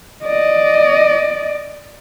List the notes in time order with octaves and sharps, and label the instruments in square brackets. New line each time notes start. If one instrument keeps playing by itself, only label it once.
[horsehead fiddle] D5 D#5